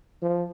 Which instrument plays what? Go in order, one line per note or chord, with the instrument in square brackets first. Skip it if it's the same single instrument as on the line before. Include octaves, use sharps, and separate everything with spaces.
[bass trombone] F3